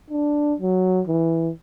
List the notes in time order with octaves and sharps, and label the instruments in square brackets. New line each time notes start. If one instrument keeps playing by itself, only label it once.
[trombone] D4
F#3
E3